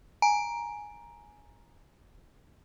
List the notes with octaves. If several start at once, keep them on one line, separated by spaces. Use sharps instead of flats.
G#5 A#5 D7